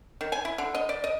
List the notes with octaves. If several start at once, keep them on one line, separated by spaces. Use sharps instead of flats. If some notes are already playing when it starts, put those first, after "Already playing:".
D#3
G#5
E4
D3
D#5
D5
D#5